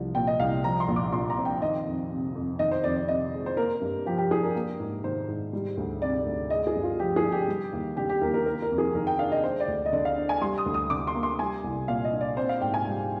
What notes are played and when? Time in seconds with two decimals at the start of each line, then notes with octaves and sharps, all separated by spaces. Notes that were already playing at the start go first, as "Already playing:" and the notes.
Already playing: C2 F3
0.15 A#2 G5
0.27 D#5
0.40 C2 F5
0.64 F3 A#5
0.80 C6
0.88 A#1
0.96 D6
1.12 A#2 C6
1.30 A#5
1.38 C4
1.45 G5
1.62 D#3 D#5
1.86 F2
2.11 C3
2.35 F2
2.59 D#3 D#5
2.71 C5
2.84 F2 D5
2.96 D5
3.08 C3 D#5
3.33 G#3
3.46 C5
3.57 A#3 A#4
3.81 G2
4.06 F3 G4
4.18 G4
4.31 D4 G#4
4.43 A#4
4.55 A#3
4.80 G#2
5.04 D#3 C5
5.28 G#2
5.53 G3
5.77 D2
6.02 C3 D5
6.26 D2
6.50 G#3 D#5
6.67 G#4
6.75 G2
6.83 F4
7.00 F3 G4
7.16 G#4
7.24 D4
7.32 G4
7.48 G3
7.73 D#2
7.97 D3 G4
8.09 G4
8.21 D#2 A#4
8.34 A#4
8.46 A#3 A#4
8.62 A#4
8.71 F2
8.78 G#4
8.95 D#3 A#4
9.07 G5
9.19 D4 F5
9.32 D#5
9.44 G#3 C5
9.60 D5
9.68 D2
9.86 D#5
9.93 D3 D5
10.05 F5
10.17 D4
10.29 G#5
10.41 G3 C6
10.58 D#6
10.66 D2
10.74 D#6
10.90 D3 D6
11.07 C6
11.15 A#3
11.23 C6
11.39 G3 G#5
11.64 C2
11.88 A#2 F5
12.05 D#5
12.13 D4
12.21 D5
12.37 C4 C5
12.49 F5
12.61 G#2 G5
12.74 G#5
12.86 G3